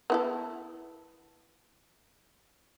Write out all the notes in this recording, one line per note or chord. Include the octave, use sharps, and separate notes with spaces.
B3 E4 A4